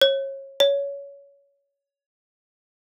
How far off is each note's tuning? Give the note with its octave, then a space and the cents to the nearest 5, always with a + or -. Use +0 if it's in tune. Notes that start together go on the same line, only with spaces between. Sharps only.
C#5 -30
C#5 +20